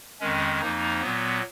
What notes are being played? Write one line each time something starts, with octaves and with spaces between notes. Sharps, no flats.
F2 D#3 G#3 C#4
F2 F3 A#3 D#4
A#2 F#3 B3